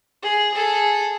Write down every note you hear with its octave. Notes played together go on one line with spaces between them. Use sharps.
G#4
G#4 A4